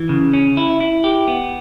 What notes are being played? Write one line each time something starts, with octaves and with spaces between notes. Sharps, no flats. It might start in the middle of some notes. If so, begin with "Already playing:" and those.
Already playing: E3
C#3
C#4
E4
E4
G4
B3